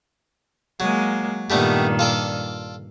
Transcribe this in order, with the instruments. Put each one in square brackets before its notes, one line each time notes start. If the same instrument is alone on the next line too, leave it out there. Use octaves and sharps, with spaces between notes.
[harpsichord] F#3 [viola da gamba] G#3 A#3
[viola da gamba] G2 A#2 D#3 [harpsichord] G3 A3 B3
[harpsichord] F4 A4 D5